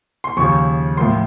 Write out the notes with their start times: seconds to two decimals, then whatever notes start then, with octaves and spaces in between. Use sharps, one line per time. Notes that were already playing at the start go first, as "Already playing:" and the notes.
0.24 C6
0.37 D#2 C#3 F3 C#6
0.97 A2 F3 A#3 C6